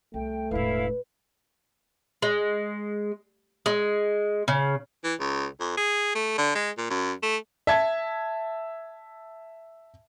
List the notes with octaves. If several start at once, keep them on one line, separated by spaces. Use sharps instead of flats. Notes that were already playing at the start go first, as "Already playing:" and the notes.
C2 A3 G5
E1 A2 E4 B4 F5
G#3
G#3
C#3
E3
C#2
F2
G#4
A3
D3
G#3
A#2
F#2
A3
E5 A5 G#6